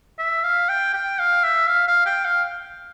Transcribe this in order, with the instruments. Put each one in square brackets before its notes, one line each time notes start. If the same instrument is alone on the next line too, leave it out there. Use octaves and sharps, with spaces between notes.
[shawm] E5
F5
G5
G5
F5
E5
F5
F5
G5
F5